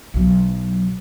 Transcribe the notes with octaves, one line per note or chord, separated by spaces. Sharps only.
B1 F#3